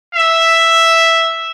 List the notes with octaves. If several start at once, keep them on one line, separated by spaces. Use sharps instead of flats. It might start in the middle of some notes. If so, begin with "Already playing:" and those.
E5